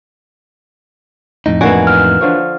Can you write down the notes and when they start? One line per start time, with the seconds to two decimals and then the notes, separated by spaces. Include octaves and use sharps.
1.46 F2 A2 D#4
1.61 D3 E3 A#3 F#4 G#5
1.87 F6
2.21 D3 F3 C#5